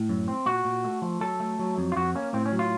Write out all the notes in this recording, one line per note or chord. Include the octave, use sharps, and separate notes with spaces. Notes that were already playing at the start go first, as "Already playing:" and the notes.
Already playing: A2
F#2
C4
A#2 F#4
A#2
A3
F3
F#3 A4
A3
F#3
F2
F4
F2 F#4
A#3 C#4
A2 C4
C#4
F#3
F4